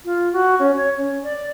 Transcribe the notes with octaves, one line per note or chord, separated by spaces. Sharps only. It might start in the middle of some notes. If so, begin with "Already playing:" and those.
F4
F#4
C#4
C#5
C#4
D5